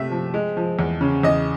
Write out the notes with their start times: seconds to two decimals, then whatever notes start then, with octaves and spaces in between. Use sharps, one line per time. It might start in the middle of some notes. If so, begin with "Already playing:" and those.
Already playing: C3 A3 C4 E5
0.11 F3
0.34 G#3
0.57 F3
0.79 E2
1.01 C#3
1.23 E2 D#5